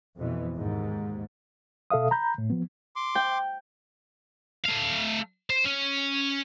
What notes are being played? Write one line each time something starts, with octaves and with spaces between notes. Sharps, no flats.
F2 B2 E3
D#2 G#2
B2 A4 E5 F5 D#6
A#5 B5 G6
A2
F3 B3
C6 D6
G5
A3 F5
C5
C#4